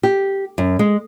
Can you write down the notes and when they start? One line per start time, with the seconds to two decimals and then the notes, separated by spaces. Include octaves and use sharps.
0.03 G4
0.58 F#2
0.79 G#3